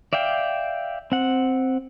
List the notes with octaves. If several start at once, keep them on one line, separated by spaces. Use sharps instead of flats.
D5 E5 F5 G5
C4 F#5